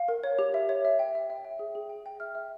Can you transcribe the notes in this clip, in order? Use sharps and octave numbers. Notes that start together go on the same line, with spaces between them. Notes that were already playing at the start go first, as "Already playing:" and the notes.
Already playing: F5
A#4
C#5
G4
E5
C#5
E5
G5
E5
E5
G5
G#4
G#4
G5
G5
E5 F6
E5